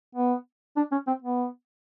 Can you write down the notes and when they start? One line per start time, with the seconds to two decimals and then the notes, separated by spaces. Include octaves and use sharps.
0.15 B3
0.76 D4
0.92 C#4
1.07 C4
1.22 B3